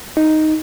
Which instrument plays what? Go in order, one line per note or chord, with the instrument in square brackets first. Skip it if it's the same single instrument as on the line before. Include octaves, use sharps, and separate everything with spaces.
[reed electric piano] D#4